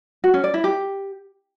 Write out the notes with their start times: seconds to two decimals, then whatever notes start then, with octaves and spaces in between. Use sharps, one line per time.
0.24 F#4
0.34 C#4
0.44 D5
0.54 E4
0.64 G4